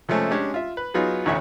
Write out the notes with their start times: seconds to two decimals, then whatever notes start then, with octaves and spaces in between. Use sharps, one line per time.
0.09 C3 F3 G#3 A3 C#4
0.31 G#3 C#4 D4 G4
0.54 F4 E5
0.77 B4
0.94 F#3 B3 D#4 F4 G#4
1.25 A1 D2 A2 C#5 E5 F#5